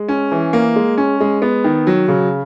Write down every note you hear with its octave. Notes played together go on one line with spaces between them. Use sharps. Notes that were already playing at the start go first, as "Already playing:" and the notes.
Already playing: G#3
C#4
E3
A#3
G#3
C#4
G#3
B3
D#3
F#3
C#3